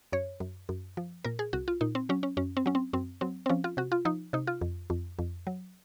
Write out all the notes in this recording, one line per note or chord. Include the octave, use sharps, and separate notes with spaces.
F#2 C#5
F#2
F#2
F3
A#2 A#4
G#4
C2 F#4
F4
A#2 D#4
C4
F#3 C#4
C#4
F#2 C#4
C4
F#3 C#4
C4
F#2 C4
F#3 C4
C4
F3 C#4
F4
C3 F#4
F4
F3 D#4
C3 D#4
F4
F2
F2
F2
F#3